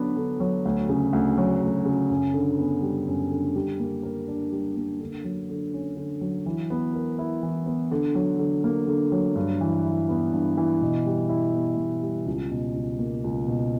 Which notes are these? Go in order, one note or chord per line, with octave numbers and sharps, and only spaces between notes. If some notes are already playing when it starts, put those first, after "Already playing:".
Already playing: D3 F#3 B3 D4
D3
F#3
D2
C#3
D2
F#3
D2
C#3
F#2
D3
B3
G3
F#2
D3
G3
A#3
A#4
D4
G3
A#3
D3
F#3
D3
C#4
D3
F#3
E3
B3
A#4
E4
E3
B3
D3
F#3
D3
A#3
D3
F#3
G2
E3
E4
B3
G2
E3
B2
G3
E4
B3
B2
G3
C#2
B2
C#2
A#3
C#2
B2